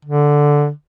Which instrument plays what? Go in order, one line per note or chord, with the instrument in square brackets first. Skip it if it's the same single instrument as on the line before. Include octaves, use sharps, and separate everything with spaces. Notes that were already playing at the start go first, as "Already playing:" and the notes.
[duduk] D3